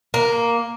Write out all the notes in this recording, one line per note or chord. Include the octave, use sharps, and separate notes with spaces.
A#3